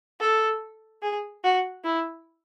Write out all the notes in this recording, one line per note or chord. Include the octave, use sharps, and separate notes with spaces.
A4
G#4
F#4
E4